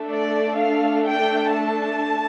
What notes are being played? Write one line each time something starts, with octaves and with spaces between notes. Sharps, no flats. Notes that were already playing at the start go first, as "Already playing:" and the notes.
Already playing: A3 D4 A4
D5
F5
G5
A5